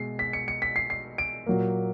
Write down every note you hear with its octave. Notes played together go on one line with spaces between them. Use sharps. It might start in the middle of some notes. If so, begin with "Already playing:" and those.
Already playing: B2 G#3 C7
B6
C#7
C#7
B6
C7
C7
D7
A#2 F#3 A#3